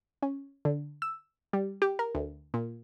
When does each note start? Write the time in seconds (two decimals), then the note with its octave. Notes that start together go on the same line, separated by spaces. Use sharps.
0.23 C#4
0.65 D3
1.02 E6
1.53 G3
1.82 G4
1.99 A#4
2.15 D2
2.54 A#2